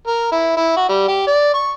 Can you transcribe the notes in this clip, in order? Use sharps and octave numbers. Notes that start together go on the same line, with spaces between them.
A#4
E4
E4
F#4
G3
G4
D5
C#6